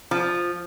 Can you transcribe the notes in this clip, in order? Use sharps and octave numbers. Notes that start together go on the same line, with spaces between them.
F3